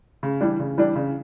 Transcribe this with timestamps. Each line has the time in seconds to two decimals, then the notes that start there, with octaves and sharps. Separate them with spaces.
0.23 C#3
0.41 E3 G3 D4
0.60 C#3
0.78 E3 G3 D4
0.96 C#3